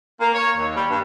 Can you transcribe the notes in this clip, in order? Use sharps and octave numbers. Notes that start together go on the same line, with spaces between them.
A#3
C#5
D#2
G3
G2